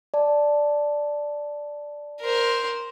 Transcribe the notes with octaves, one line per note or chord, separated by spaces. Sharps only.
D5 A5
A#4 C5